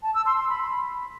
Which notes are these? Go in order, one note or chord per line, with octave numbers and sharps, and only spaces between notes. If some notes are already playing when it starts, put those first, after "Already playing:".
A5
E6
C6
C6
B5